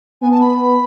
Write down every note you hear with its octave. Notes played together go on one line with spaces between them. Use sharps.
B3 G#5
A5
B5